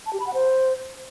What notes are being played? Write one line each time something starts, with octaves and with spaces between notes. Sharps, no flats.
A5
G4
B5
F#5
C5